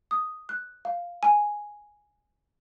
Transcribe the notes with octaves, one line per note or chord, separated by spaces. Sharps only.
D#6
F#6
F5
G#5